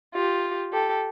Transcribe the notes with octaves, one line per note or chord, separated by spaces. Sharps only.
F4 G4
G4 A4